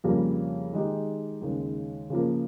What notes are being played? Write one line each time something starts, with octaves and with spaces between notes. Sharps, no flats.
F2 C#3 G3 A#3
D#3 G#3 D#4 G4
D#2 C#3 G#3
C#3 F3 A#3